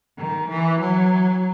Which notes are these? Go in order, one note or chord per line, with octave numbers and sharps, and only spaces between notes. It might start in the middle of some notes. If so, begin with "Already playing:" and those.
D#3
E3
F#3